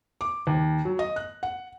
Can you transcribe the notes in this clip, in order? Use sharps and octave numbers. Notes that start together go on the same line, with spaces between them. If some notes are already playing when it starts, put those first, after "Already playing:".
D6
D#2
F#3
D#5
F#6
F#5